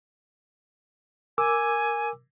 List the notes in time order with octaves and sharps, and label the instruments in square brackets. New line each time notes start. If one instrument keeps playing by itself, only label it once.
[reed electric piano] A#4 D6 E6 [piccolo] G#5